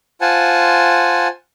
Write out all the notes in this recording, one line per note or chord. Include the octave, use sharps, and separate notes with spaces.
F4 C5 F#5 G#5 A5